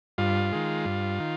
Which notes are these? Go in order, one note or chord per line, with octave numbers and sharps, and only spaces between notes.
G2 F4
D#3 G#3
G2
D#3